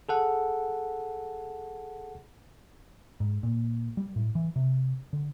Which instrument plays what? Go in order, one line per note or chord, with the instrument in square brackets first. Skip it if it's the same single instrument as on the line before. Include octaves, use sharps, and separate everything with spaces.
[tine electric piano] G#4 A4 F#5
[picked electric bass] G#2
A#2
G3
A2
E3
C3
D3